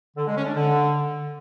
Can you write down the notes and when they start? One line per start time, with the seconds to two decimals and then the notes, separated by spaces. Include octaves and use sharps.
0.17 D3
0.27 G#3
0.36 C#4
0.46 D4
0.56 D3